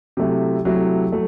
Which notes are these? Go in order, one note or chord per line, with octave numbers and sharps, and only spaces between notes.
C3 F#3 A3 E4
C3 F#3 A3 E4
F#3 A3